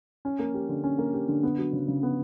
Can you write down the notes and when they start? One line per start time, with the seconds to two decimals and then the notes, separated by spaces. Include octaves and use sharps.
0.25 C#4
0.39 A#3
0.54 G4
0.69 D3
0.84 C#4
0.98 A#3
1.14 G4
1.28 D3
1.43 B3
1.58 F#3
1.73 C#3
1.88 C#3
2.03 B3